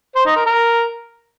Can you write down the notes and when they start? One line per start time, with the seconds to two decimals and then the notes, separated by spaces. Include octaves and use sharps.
0.15 C5
0.26 D#4
0.36 A#4
0.46 A#4